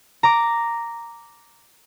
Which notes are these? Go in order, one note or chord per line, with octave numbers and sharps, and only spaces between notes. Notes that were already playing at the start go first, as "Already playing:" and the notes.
A#5 D6